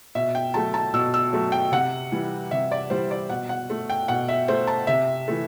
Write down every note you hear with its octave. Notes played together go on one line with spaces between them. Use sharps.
B2 E5
G5
F#3 A3 A5
A5
B2 E6
E6
F#3 A3
G5
C3 F#5
E3 G3
C3 E5
D5
E3 G3 C5
D5
B2 F#5
F#5
A3
G5
B2 F#5
E5
A3 C5
A5
C3 E5
E3 A3